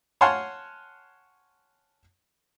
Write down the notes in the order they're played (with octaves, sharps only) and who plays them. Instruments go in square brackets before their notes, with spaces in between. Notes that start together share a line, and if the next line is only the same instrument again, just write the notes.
[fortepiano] C#5 F5 F#5 G#5 A5 C6